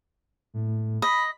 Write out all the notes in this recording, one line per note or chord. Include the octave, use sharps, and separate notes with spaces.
A2
D#5 B5